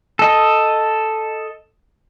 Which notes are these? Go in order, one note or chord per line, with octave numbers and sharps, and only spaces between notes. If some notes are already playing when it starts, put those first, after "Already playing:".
A4 D#5